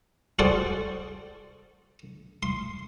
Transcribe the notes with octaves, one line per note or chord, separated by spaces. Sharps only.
F#4 G#4 A4 C5 D5 G5
C6